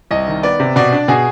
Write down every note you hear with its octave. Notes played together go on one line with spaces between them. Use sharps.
C2 D#5
D#3
B3 D5
C3
B2 D5
D4
B2 G#4